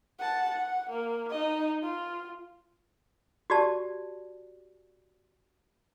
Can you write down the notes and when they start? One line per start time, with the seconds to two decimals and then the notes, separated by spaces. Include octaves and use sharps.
0.19 F#5 A5
0.50 F#5
0.90 A#3
1.30 D#4 D#5
1.83 F4
3.50 F#4 G4 D5 A5